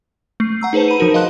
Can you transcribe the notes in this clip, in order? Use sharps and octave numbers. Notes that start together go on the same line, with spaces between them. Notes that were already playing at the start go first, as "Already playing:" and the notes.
A3 C7
F#5 A#5 E6
D#4 G#4 B4 C5 A5
B5 D#7
F3 D#4 F#4 A#4
D#5 F5 A5 C6 F#6